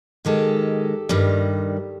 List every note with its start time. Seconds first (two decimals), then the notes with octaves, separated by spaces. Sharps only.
0.25 G#2 D#3 G#3 G4 A4
1.09 G2 D#3 G3